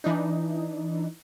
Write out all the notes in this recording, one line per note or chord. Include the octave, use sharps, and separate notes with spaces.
E3 D4 D#4